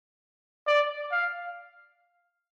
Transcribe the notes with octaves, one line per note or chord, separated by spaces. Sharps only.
D5
F5